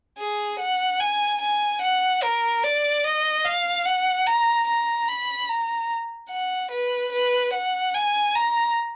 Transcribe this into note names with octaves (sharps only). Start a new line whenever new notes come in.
G#4
F#5
G#5
G#5
F#5
A#4
D5
D#5
F5
F#5
A#5
A#5
B5
A#5
F#5
B4
B4
F#5
G#5
A#5